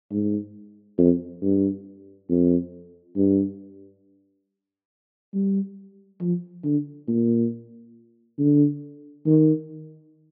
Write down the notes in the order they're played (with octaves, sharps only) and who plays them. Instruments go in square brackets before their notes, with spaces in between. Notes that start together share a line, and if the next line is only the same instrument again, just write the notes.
[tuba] G#2
F2
G2
F2
G2
G3
F3
D3
A#2
D3
D#3